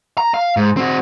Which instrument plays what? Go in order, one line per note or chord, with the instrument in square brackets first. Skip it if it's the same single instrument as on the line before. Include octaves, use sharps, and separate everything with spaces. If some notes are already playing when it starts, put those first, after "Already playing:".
[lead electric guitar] A#5
F5
G#2
C4 F#4